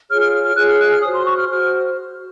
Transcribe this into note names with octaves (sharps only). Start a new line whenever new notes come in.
F4 G#4 C#5 F6
F6
F6
F6
F4 G#4 C#5 F#6
F6
F#6
F6
F#4 C5 D#6
C6
C#6
F6
F#4 C5 F6